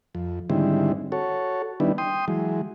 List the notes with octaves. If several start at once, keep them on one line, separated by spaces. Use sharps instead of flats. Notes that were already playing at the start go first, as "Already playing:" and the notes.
F2
G#2 D3 D#3 G3 C4 E4
F#4 A4 C#5
D#3 G3 B3 D4 E4
G5 C6 D#6
E3 F#3 G#3